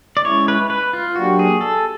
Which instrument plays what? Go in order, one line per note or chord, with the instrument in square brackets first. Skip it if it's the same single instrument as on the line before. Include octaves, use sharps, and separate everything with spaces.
[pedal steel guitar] D5
[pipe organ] G#3 C#4 E4 [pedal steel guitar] C#5
[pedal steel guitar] B4
B4
F4
[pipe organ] F#3 A#3 D4 G4 [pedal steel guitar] F#4
[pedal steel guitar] G#4
A4